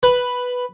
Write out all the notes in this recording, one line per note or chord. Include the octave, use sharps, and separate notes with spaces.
B4